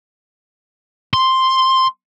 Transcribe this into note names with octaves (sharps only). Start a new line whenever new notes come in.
C6